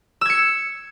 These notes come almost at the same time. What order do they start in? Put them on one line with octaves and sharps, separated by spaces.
E6 G#6 C#7